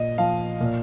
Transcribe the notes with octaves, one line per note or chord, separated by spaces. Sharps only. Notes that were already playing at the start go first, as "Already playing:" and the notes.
Already playing: A#2 D#5
F3 F5
A#2